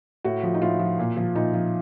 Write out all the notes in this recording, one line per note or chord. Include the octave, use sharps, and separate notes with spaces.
A2 F#4
F3
D#4
A2 F4
F3
A#2
F3
A#2 D#4
F3